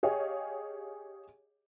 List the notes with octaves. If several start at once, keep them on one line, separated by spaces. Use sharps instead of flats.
G4 G#4 C#5 D#5 F5